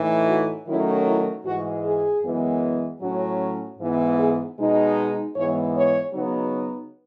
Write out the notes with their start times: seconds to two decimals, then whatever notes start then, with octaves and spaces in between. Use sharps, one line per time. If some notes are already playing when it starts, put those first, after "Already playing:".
Already playing: A2 E3 A3 D#4
0.28 F#4
0.67 D#3 F#3 A3 C#4 E4
1.06 E4
1.45 G#2 E3 G#3 F#4
1.84 G#4
2.23 F#2 E3 G#3 B3
3.02 A2 F#3 C#4 F#4
3.79 G#2 E3 B3
4.18 G#4
4.58 B2 G#3 D#4
5.35 G#2 E3 G#3 B3 C#5
5.76 C#5
6.14 C#3 F#3 B3 D#4